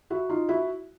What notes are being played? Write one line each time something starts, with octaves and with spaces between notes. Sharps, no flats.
E4 F#4
D#4 F4
E4 F#4